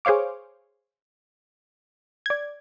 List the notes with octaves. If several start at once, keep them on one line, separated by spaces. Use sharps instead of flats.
G#4 C5 C#5 F5 D6
D5 G#6